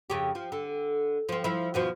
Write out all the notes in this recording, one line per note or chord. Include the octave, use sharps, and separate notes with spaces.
F2 C#3 G4
F3
D3
F3 C4
F3 E4
D#2 B2 F3